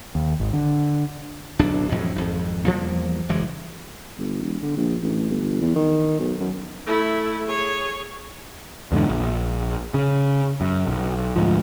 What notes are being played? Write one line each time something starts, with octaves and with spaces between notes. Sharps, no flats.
D#2
G#1
D3
D1 B1 D4
A1 F2 A2 F#3
G#1 F2
E2 F3 G3 A#3
F#1 E3 G#3
G1
E1
D3
A#1
A1
G1
E2
D#3
B1
F#2
A3 E4
G#4 C#5
E2 G#2 B2 D3
A#1
C#3
F#2
B1
D2 G#2 F3